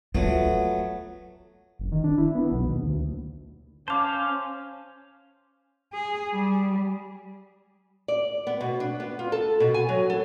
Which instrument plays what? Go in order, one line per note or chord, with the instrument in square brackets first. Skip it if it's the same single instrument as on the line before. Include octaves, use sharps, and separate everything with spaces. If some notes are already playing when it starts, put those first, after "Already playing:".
[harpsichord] F#3 A3 B3 [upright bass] F4
[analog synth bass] F#1
D#3
D4
E4
B3
B1
D#2
D2
[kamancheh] C#4 [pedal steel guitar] C5 F5 [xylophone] A5 D6
[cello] G#4
G3
[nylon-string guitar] D5
B3
B2
D4
B3
F4
A4
B2
G#5
F#3
A4